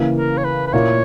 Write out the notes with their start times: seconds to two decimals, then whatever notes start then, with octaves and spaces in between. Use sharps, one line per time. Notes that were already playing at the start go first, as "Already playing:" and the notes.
Already playing: C#3 E3 A#3 E4
0.17 A#4
0.38 C#5
0.44 B4
0.67 B4
0.73 A#2 A#3 E4 A#4 C#5